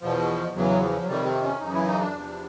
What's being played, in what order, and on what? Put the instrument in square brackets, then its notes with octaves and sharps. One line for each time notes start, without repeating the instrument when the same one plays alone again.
[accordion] E2 B2 F3
E2 C#3 E3 F#3
F3
F#3
F2 C3 D#3 G3
C4
C#4
F#2 C#3 E3 D#4
E4
D#4
D4
E2 C3 F3